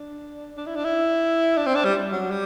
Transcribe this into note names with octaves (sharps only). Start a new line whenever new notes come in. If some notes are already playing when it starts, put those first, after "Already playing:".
Already playing: D4
D4
E4
D4
E4
D4
C4
D4
G3
F#3
G3